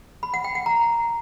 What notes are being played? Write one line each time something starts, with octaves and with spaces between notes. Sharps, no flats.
B5
F#5
G5
F#5
A#5